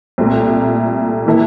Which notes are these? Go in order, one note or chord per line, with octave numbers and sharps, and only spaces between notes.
C2 A#2 A3
E3 A#3 E4 A4